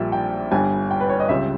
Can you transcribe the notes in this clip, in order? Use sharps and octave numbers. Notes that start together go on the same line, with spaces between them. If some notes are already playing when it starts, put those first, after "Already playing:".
Already playing: A#1 A#2 G3 E5 G5
G5
G1 G2 G3 G#5
G5
B4
C#5
D#5
C#2 C#3 G3 E5